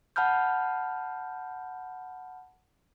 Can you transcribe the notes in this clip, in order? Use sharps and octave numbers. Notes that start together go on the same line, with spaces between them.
F#5 A5 B5 F6 G6